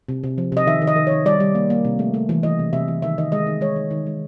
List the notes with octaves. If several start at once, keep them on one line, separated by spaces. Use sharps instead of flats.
C3
C3
F3
C3 D#5
D#3 E5
D#3
D#5
D#3
D#3 C#5
G3 D5
G3
A#3
A#3
C3
A3
A3
E3
E3 D#5
C3
C3 E5
E3
D#3 E5
D#3 D#5
G#3 D#5
D#3
G#3 C#5
D#3
D#3
G#3